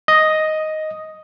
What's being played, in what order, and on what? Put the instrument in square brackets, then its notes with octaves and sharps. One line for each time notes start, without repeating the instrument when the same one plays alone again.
[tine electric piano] D#5